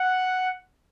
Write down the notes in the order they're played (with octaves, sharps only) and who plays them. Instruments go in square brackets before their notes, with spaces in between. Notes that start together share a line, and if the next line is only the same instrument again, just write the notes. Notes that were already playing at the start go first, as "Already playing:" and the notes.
Already playing: [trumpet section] F#5